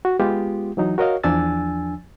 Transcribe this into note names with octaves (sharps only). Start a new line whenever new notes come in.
F#4
G#3 B3 F4 G4
E3 F#3 D#4
F#4 A#4 C#5 D#5 F5
E2 F3 D4 G#5 E6 A6